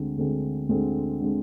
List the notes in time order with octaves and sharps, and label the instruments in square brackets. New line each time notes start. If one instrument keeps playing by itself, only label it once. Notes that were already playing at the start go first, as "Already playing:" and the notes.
Already playing: [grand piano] D2 D3 G#3 C4
D2 D3 G#3 C4
D2 D3 G#3 C4
D3 G#3 C4